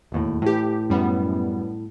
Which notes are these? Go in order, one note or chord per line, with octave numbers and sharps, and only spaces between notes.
E1 D#2 A2
A2 E3 G4
F#2 G3 B3